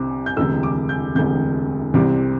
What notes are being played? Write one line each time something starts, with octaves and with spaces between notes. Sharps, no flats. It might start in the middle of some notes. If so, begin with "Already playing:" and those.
Already playing: C2 C3 G3 C4 D6
G6
E1 D2 C3 E6
D6
G6
E1 D2 C3 G6
C2 C3 G3 C4 D6